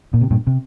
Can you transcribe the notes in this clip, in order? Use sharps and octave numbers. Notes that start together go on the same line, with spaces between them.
A#2
C3
G2 A#2
C3